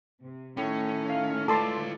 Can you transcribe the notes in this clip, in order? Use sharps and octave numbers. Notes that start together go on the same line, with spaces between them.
C3
A2 D#3 A3 C#4
F5 F6
F4 A4 B4 D5 C6 D6 A6